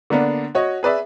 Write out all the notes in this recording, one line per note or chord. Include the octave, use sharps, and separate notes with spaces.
D3 A#3 B3 D4
F#4 C#5 D#5
G#4 B4 D5 E5